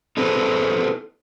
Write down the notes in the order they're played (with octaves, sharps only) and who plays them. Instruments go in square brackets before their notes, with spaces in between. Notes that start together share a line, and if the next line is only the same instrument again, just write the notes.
[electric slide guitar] D#4 E4 A4 B4 C5